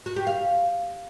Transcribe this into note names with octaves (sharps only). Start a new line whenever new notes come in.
F#4
G4
F5